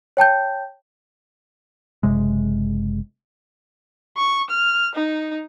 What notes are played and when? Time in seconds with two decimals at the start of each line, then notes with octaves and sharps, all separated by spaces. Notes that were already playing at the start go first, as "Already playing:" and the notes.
0.17 C#5 G5 A5 G6
2.03 F#1 C3 G#3
4.17 C#6
4.50 F6
4.95 D#4